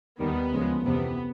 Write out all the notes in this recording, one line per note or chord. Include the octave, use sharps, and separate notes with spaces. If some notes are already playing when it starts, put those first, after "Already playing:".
D#2 D#3 G3 B3
D2 C#3 F3 G#3
F2 C3 E3 G3 B3